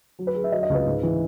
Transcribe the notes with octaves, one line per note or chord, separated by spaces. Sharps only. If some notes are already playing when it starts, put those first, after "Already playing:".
F#3
B4
F#3 G#4
E5
F#3 D#5
D#5
C#2
B4
G#2
E3